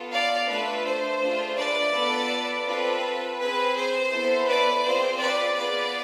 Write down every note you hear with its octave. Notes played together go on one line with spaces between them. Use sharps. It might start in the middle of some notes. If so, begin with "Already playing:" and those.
Already playing: B3 F4 A4
D5 F5
A3 D4 F4 A4 B4
C5
A3 D4 F4 G#4
B4 D5
B3 F4 A4
C4 F4 A4 B4
C4 G#4 B4
C5
B3 E4 A4
B4 D5
C4 F4 G#4 C5
B4 D5
B3 F4 G#4 B4 D5